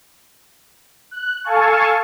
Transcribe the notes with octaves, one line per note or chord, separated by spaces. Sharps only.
F#6
A4 F5 G#5 A5 C#6